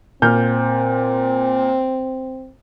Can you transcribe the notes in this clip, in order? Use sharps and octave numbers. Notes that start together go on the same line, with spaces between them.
A#2 C4 F6 G6